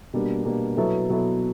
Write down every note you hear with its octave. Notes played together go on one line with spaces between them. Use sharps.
B2 G3 A#3 D4
B2 G3 A#3 D4
B2 F#3 B3 E4 A4
B2 F#3 B3 E4 A4